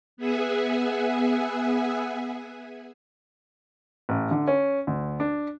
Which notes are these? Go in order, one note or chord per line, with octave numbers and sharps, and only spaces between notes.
B3 G#4 E5 F#5 G#5
A1
D3
C#4
D2
D4